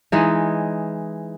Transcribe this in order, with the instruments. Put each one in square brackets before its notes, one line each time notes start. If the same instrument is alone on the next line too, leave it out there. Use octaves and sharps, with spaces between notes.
[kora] E3 G#3 D#4